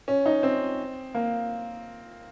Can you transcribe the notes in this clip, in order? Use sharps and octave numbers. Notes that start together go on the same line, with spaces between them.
C#4
D#4
C4
A#3